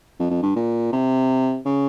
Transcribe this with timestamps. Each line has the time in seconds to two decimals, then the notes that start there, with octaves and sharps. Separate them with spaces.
0.19 F2
0.30 F2
0.43 G2
0.56 A#2
0.93 C3
1.66 C#3